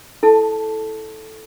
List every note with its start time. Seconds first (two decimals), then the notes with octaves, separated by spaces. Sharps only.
0.23 E4 A4 A5